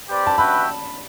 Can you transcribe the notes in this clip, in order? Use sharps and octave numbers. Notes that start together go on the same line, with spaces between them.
C4 G4 B4 D5
A5
F#4 B4 E5 G5 B5